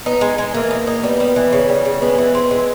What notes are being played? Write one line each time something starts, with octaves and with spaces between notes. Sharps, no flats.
B3 D#4
G#3
G#3
E3 A#3
D#4
D#4
G3 B3
G3
E3
C#3
G3
C#3
G#3 B3
E3
C4
G#3